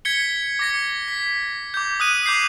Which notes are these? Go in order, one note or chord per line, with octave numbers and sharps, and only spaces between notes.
G#6 B6 C#7 G7
D6 A#6 C#7
B6
D6 G6
D#6 F#6 D#7
D6 G6 C7